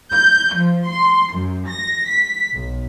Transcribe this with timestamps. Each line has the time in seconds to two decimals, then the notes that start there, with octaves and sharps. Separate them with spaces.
0.11 G6
0.53 F3
0.88 C6
1.33 F#2
1.67 A#6
2.08 B6
2.53 B1